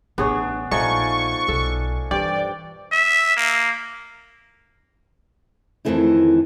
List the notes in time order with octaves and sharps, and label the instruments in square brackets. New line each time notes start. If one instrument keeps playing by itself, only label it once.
[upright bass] A1 [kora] B3 G#4 C#5 [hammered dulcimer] D4
[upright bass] A#1 [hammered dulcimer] F3 D5 G#5 [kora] A3 D#4 [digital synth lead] C#6
[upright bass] B1 [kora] A4
[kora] G2 [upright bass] E3 [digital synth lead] D5 [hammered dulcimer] G5
[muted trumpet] E5
A#3
[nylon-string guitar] F2 A2 D#3 E3 A3 E4